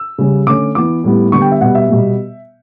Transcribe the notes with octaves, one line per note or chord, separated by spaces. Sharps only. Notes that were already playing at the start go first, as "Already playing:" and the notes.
Already playing: E6
C#3 G3 C#4
D3 A3 C#4 D6
E3 B3 D6
A2 G3 B3
D3 G3 B3 C#6
G5
E5
B2 G3 B3 F#5
E5
B2 G3 B3